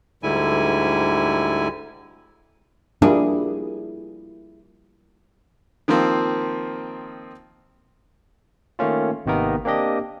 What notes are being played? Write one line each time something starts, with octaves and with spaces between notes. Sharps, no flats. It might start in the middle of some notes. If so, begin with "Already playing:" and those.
D2 G#2 D3 G3 E4 G#5
F3 G3 A#3 D4 E4 G#4
D#3 F3 A#3 C4
D#3 A3 A#3 C#4 F4
G#1 C3 D#3 A#3 B3 A#4
A#3 C4 D4 G4 D#5